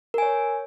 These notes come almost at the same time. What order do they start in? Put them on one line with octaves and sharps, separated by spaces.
A#4 G#5 C#5